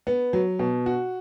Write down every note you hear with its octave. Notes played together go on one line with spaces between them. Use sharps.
B3
F#3
B2
F#4